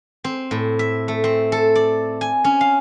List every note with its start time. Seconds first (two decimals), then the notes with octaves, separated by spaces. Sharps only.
0.24 C4
0.51 A2
0.79 E5
1.08 A3
1.24 C4
1.52 A4
1.75 D5
2.21 G#5
2.44 C#4
2.61 F5